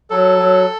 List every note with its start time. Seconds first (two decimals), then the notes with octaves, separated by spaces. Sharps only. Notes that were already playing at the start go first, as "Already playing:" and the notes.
0.10 F#3 A4
0.38 F#3